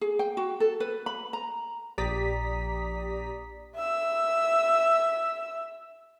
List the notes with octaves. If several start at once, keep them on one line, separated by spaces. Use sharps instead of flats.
G#4
G5
F#4
A4
B4
B5
A#5
A#1 G4 D5 A#5 D#6 B6
E5 E6